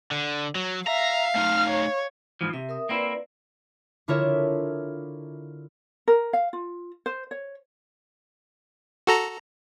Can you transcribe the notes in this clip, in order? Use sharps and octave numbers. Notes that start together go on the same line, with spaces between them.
D3
F#3
E5 F5 A#5
A3 D#4 F6
C#5
G#2 E3 F3
C3 E5
A#4 E5 D#6
A#3 C4 E4 B4 D5
D3 E4 F4 A#4 C#5 E5
A#4
F5
F4
C5
C#5
F#4 A4 A#5